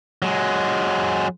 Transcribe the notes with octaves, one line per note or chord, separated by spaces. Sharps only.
F#3 G#3